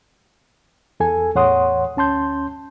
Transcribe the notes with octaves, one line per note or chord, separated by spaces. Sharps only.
E2 A4 G#5
E2 A2 C#5 F#5 C6 D#6
D2 C#4 A5 C6 G6